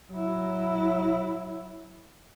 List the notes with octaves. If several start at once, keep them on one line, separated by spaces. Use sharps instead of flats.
F#3 E4